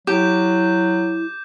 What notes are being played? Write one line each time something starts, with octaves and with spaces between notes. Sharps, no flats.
F#3 E4 G4 D6 G6